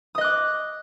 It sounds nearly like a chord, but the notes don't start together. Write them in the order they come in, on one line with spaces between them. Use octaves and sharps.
D#6 D#5 F#6 D6